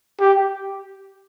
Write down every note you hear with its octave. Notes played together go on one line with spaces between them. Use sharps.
G4